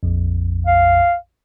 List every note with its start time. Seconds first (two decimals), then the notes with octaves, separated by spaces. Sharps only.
0.03 A#1 F2
0.67 F5